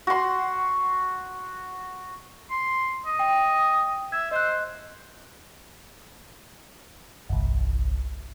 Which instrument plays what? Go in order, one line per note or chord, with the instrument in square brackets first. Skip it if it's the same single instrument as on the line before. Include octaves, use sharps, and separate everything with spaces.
[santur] F#4 C6
[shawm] C6
D#5
[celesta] G5
[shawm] E5 [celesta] G#6
[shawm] C5 [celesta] D#5 F#6
[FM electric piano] G1 C2